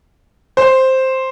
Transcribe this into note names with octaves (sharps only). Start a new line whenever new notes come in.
C5